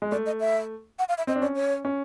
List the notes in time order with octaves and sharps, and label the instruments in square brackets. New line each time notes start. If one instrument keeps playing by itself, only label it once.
[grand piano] G#3
[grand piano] A3 [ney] D5
[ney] D#5
E5
F#5
F5
E5
[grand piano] C4 [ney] D#5
[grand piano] D4
[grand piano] C#4 [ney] D5
[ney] C#5
[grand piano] C#4